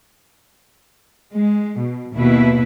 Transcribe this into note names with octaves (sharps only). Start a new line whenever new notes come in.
G#3
B2
D#2 B2 E4 B4